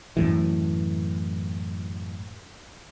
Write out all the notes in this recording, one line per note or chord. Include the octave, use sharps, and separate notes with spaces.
F#2 A2 E3